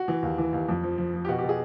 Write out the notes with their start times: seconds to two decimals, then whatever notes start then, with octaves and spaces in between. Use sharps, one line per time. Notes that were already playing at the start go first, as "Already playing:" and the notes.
Already playing: F#4
0.08 E3
0.22 D#2
0.38 E3
0.53 D#2
0.69 F2
0.83 F3
0.98 F3
1.14 F3
1.25 G4
1.28 B2 F#4
1.38 G4
1.43 B2
1.49 G#4